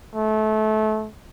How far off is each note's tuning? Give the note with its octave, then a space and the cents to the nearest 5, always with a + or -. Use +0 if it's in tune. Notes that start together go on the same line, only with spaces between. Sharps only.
A3 -25